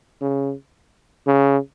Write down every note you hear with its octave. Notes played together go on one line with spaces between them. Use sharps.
C#3
C#3